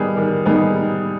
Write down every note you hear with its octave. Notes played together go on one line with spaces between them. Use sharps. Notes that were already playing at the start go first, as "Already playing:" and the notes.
Already playing: D#3 G3 B3 D#4 G#4
D#3
G3 B3 D#4 G#4